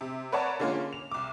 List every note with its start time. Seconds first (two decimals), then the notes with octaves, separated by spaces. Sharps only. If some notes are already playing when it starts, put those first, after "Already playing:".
0.01 C3
0.32 A#4 B4 C#5 D5 F#5 A5
0.60 D3 G#3 A#3 C#4 F4
0.93 F7
1.11 C2 D6